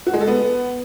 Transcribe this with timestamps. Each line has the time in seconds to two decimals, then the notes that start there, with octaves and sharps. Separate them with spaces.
0.07 F#4
0.14 G#3
0.21 A4
0.28 B3